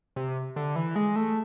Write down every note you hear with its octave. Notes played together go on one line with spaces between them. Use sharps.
C3
D3
E3
G#3
A3